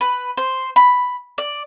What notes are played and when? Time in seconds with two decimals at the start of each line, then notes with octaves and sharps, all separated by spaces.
0.01 B4
0.37 C5
0.76 B5
1.38 D5